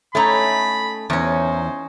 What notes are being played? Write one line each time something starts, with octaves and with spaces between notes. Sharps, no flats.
A3 C#4 D#4 E4 A#5 B5
E2 C#4 D#4 C5